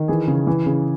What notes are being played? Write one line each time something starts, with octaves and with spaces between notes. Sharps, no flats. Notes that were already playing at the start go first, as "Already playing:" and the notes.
Already playing: D#3
E3 G#4
C#3
E3
C#3